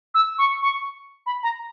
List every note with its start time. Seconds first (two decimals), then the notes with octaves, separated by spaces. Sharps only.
0.14 E6
0.38 C#6
0.62 C#6
1.26 B5
1.43 A#5